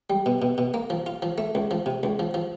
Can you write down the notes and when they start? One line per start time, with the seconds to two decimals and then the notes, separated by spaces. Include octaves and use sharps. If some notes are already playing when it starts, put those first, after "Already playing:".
0.10 G3
0.26 B2
0.42 B2
0.58 B2
0.74 A#3
0.90 F3
1.06 F4
1.22 F3
1.38 A3
1.55 C#2
1.71 F3
1.86 C3
2.03 C#2
2.19 F3
2.34 F3